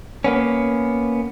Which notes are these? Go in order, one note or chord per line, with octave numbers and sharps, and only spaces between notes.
A#3 B3 C#4